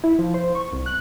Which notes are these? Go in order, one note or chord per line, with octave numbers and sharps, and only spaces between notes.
E4
F3
C5
C#6
C2
F#6